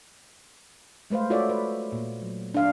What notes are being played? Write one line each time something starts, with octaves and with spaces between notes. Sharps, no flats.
G#3 A3 B4 C5 F5
F4 F#4 A4 C#5 D5 E5
B4
A#2
F#3
D4 F5